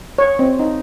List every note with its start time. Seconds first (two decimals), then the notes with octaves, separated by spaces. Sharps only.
0.18 C#5
0.39 C4
0.59 D#4